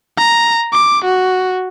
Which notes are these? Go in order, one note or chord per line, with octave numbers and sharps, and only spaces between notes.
A#5
D6
F#4